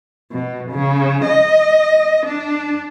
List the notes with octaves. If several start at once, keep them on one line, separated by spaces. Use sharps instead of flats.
B2
C#3
D#5
D4